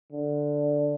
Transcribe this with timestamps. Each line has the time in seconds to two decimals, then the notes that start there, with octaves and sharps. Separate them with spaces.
0.12 D3